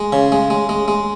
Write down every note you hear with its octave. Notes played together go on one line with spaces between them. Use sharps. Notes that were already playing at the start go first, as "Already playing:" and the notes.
Already playing: G#3
C#3
G#3
G#3
G#3
G#3